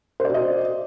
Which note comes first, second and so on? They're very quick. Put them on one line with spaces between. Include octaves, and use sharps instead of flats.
C5 D5 F#4 D#5